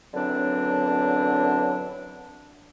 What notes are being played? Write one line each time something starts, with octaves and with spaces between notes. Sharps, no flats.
F#2 D3 E3 F#3 C4 D4